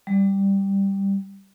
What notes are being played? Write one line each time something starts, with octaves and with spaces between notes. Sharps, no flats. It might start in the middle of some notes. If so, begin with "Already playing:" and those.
G3